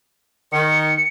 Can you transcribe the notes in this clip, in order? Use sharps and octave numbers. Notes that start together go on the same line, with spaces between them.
D#3 C#7